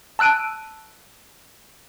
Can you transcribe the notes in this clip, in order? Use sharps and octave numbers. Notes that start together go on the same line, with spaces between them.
A5 E6 F#6 D7 D#7